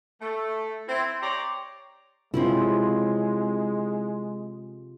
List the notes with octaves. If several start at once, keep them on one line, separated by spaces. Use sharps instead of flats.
A3
C4 E4
G4 C#5 D5 A#5 C6
C3 G#3 C4 C#4 E4 F4